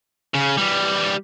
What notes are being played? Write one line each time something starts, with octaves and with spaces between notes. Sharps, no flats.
C#3
E3 G3